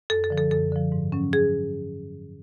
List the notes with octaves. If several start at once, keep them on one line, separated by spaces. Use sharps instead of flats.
F#2 A4
A4
D3 F3
A4
F#2 A4
D3 F3
G#2
F#3 C#4
G#4